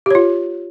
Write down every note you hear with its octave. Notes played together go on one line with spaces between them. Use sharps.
F4 G4 C#5